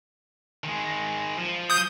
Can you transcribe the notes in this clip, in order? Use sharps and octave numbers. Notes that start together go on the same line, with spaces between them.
D#3 G#3
F3
D#6 G6